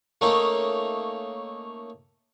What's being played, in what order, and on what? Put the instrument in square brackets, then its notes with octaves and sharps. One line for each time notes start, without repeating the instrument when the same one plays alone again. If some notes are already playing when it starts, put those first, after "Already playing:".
[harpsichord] A3 A#3 C#4 D#4